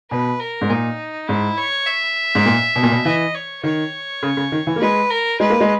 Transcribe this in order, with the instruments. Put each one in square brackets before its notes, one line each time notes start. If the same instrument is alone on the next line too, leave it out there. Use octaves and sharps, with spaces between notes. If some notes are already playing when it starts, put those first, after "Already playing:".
[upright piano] B2 [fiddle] B4
[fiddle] A#4
[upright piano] G#2
[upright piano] A#2 [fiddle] D#4
[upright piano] G#2 [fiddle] E4
[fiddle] C#5
E5
[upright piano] G#2
A#2
B2
A#2
B2
[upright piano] E3 [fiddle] D#5
[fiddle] C#5
[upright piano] D#3 [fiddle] C#5
[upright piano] C#3
C#3
D#3
E3
A#3
[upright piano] G#3 [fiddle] B4
[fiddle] A#4
[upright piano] G#3 [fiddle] B4
[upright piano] A#3
G#3